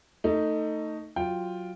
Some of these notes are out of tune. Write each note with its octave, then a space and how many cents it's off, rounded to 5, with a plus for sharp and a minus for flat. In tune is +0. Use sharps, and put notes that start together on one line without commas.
A3 +20 D#4 +0
F#3 +0 F4 +0 G5 +0